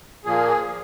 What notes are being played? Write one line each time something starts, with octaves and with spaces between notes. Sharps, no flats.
A#2 F3 A#3 G#4